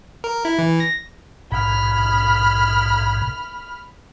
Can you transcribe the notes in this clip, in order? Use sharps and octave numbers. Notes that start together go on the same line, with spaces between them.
A#4
E4
E3
A#6
A#1 G#2 B2 B5 F6